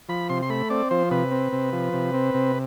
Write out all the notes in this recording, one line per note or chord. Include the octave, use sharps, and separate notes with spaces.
F3 B5
C3 C6
C6
A3 B5
C4 D5
F3 C5
C3 B4
C4
C3
F3
C3
C4
C3